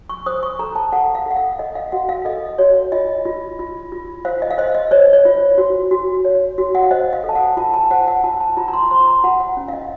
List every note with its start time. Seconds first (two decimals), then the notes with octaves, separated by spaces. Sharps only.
0.09 C#6
0.26 C5 D#6
0.43 C#6
0.59 A4 A#5
0.76 A5
0.92 A4 F#5
1.15 F5
1.26 A4 F#5
1.36 F5
1.59 A4 D#5
1.75 F5
1.92 F#4 F#5
2.09 F5
2.25 A4 D#5
2.58 F#4 C#5
2.92 F4 D#5
3.25 F4
3.59 F4
3.92 F4
4.25 C5 F5
4.42 D#5
4.51 F5
4.58 C5 D#5
4.75 D#5
4.91 C5 C#5
5.13 C#5
5.25 F4
5.58 F#4
5.91 F#4
6.25 C#5
6.58 F#4
6.75 F#5
6.82 F5
6.91 C5 D#5
7.13 F5
7.24 A4
7.29 A5
7.35 F#5
7.57 F4 A5
7.74 A5
7.91 C5 F#5
8.08 F#5
8.24 F4 A5
8.41 A5
8.57 F4 A#5
8.68 A#5
8.73 C6
8.91 C5 C6
9.07 A#5
9.24 F4 F#5
9.40 F#5
9.57 C#4
9.68 F5
9.73 D#5